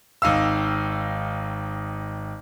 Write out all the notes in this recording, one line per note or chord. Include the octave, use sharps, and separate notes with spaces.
G#1 D#4 F5 E6